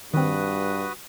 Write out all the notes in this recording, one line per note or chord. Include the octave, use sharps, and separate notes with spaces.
G2 D#3 C4 F#4 B4 D#6